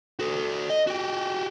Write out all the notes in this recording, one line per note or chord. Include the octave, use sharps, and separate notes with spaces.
F#4 A4
D#5
F#4 G4